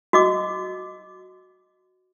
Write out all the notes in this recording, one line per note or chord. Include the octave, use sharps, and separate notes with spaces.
F#4 D#5 D6